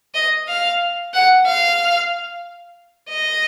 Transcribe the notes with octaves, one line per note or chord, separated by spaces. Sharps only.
D#5
F5
F#5
F5
D#5